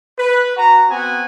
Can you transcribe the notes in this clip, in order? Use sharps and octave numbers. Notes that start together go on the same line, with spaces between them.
B4
F#4 A#5
B3 C4 F#4 F#5 G#5